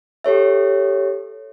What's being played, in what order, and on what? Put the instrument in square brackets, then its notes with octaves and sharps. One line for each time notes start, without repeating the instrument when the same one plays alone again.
[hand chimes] G4 A4 C#5 E5